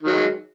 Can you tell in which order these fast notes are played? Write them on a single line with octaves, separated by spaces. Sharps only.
D#3 F#3 G#3